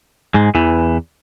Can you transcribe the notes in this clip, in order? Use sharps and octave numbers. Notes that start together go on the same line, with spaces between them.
G#2 G#3
E2 E3